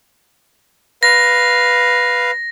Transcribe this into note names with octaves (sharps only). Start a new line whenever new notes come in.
B4 F5 A#6